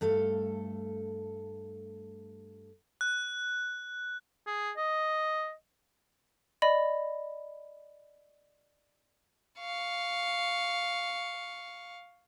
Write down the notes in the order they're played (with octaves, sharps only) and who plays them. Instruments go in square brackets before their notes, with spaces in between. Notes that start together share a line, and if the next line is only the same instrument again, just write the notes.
[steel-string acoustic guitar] G2 A3 A4 F5
[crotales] F#6
[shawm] G#4
D#5
[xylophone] D5 D#5 B5
[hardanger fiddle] F5 C#6